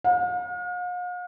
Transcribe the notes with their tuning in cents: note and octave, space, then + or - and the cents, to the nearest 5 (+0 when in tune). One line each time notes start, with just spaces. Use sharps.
F5 +45